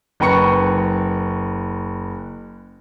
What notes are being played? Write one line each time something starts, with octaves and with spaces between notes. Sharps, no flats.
F#1 B4 G5 A#5 C#6 C#7